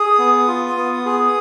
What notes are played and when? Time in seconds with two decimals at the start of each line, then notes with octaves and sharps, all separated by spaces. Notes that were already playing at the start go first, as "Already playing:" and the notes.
Already playing: G#4 D#6
0.18 B3
0.48 F4
0.77 B3
1.06 G#4